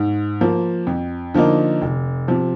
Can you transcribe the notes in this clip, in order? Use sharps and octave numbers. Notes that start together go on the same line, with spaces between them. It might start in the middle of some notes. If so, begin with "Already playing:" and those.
Already playing: G#2
F3 A#3
F2
D3 F3 A#3 D#4
F1
C3 F3